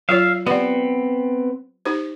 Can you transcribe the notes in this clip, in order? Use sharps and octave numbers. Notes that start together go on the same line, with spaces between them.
F#3 F4 C#5 E5 F5
B3 C4 G4 D5 F#5
D#4 G4 C5